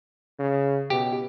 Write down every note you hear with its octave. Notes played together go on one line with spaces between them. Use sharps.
C#3
B2 G4